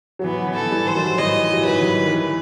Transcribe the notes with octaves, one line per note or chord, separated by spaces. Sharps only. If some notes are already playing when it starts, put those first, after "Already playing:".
F#3
E3 B3
E3
A4
E3 G3
C5
D#3 F#3
E3 G3 D#5
F#3
E3
D#3 F#3 B4
E3
D#3
E3